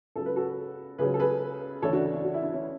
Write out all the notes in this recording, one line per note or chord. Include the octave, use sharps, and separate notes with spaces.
C#2 C#3 F#3 A4
B4
F#4 A4
C#2 C#3 F#3 G#4 B4
A4
G#4 B4
D2 C#3 E3 A4 C#5
D4 F#4
D4
F#4
E4
D4
C#4 E4